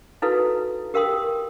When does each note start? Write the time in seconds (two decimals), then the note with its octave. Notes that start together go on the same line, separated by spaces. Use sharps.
0.22 D#4 E4 F#4 A4 B4 F5
0.94 G4 A#4 F5 G5 C6 D#6